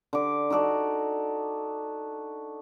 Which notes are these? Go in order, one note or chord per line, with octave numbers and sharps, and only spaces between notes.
D3 D6
D#4 F#4 A4 D5